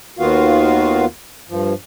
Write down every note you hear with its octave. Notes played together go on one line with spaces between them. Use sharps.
D#2 D#3 B3 F4 F#4 F5
G2 F3